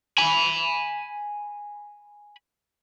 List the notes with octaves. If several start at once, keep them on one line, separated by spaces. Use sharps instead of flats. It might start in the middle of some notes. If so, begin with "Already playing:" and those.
G#5 B5